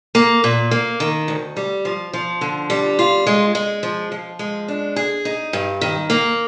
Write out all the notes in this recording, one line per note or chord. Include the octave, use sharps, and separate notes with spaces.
A#3
A#2
A#3
D#3
D2
G3
F3
F3
D3
G3
F4
G#3
G#3
F3
F3
G#3
D4
G#4
D#4
G2
D#3
A#3